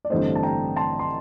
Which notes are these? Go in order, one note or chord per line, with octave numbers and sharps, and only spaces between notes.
D5
A1 G2 D3 A3 C4 C5 D#5
A5
G5 A#5
A5 C6
C6